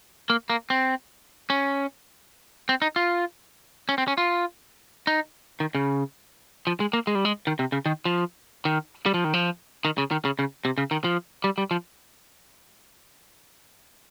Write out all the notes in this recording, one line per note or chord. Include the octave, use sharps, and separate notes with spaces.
A#3
A#3
C4
C#4
C4
D#4
F4
C#4
C4
C#4
F4
D#4
D#3
C#3
F3
G#3
A#3
G#3
G3
G#3
D#3
C3
C#3
D#3
F3
D#3
G3
F3
D#3
F3
D#3
C#3
D#3
C#3
C#3
C3
C#3
D#3
F3
G3
G3
F3